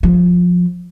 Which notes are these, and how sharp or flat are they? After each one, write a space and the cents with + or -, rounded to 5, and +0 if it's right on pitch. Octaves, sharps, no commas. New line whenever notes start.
F3 +20